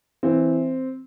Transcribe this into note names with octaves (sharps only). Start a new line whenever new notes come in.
E3 C4